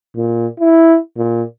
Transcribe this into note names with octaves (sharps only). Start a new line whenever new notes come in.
A#2
E4
A#2